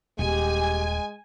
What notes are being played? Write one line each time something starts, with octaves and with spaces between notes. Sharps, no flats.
D#1 G#3 G4 G#5